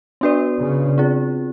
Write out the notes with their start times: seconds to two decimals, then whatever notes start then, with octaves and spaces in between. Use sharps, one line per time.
0.21 B3 D4 F#4 B4 D5
0.59 C#3
0.98 C4 F4 G#4